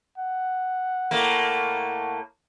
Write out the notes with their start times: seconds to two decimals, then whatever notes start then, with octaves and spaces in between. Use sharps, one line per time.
0.18 F#5
1.11 A2 A3 A#3